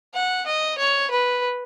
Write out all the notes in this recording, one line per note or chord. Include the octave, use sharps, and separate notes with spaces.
F#5
D#5
C#5
B4